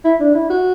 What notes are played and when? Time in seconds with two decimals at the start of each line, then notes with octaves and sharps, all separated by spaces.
0.04 E4
0.20 D4
0.35 E4
0.50 F#4